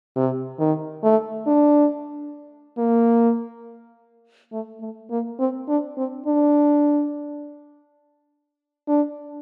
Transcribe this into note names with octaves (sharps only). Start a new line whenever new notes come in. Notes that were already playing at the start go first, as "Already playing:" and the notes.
C3
D#3
A3
D4
A#3
A3
A3
A#3
C4
D4
C4
D4
D4